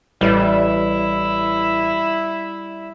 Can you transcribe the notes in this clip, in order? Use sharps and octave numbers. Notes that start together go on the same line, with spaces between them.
A1 G3 E4 E5